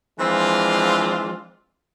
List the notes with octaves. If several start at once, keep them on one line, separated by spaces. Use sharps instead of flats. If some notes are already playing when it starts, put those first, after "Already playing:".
E3 F3 G#3 C4 D4 F4